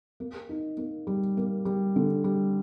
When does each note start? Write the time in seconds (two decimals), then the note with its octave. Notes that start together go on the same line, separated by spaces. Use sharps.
0.20 A#3
0.49 D#4
0.77 A#3
1.07 G3
1.37 A#3
1.65 G3
1.96 D3
2.24 G3